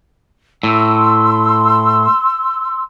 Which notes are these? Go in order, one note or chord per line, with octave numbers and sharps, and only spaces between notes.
A2 C6 E6